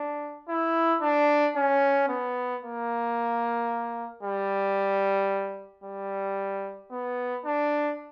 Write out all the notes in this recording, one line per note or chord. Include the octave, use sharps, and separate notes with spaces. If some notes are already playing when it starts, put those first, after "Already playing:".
Already playing: D4
E4
D4
C#4
B3
A#3
G3
G3
B3
D4